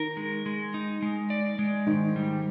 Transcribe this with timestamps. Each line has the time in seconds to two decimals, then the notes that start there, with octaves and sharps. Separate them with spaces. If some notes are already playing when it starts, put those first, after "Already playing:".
Already playing: D#3 A#4
0.17 G#3
0.46 G#3
0.74 D#4
1.02 G#3
1.30 D5
1.59 G#3
1.87 G#2 D#3
2.16 G3